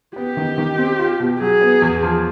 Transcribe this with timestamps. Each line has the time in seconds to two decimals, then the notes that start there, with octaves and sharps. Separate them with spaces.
0.16 B3 G4
0.37 D#3
0.58 D#3
0.78 C4
0.99 F4
1.20 B2
1.41 F#3 G#4
1.61 B3
1.82 E2
2.03 F3